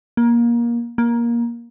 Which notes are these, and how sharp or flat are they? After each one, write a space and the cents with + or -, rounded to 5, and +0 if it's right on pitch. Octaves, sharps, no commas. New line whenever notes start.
A#3 +20
A#3 +15